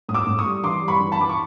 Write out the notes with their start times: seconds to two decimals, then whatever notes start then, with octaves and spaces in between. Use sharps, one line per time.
0.09 A2 D#6
0.14 D6 E6
0.26 A2
0.39 C#6 D#6
0.46 G3
0.64 E3 C6 D6
0.82 G3
0.88 B5 C#6
1.01 E3
1.12 A5 B5
1.19 E3 D6
1.30 C#6